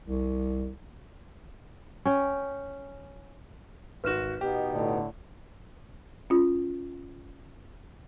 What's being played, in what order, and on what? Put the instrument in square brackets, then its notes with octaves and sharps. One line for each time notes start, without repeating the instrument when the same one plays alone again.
[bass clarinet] C2
[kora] C#4 G5
[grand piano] G#1 F#4 [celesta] B4 F6 E7
[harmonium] B2 B3 D#4 [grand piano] G4
[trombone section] A2 D3
[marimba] C#4 F4